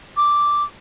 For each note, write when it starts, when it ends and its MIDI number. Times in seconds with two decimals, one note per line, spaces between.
0.17 0.64 86